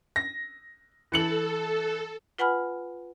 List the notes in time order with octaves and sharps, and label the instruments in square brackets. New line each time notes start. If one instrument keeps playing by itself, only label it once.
[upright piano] A#6
[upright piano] E3 C#7 F#7 [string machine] A4
[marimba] F4 B4 F#5 G#5 B5 F6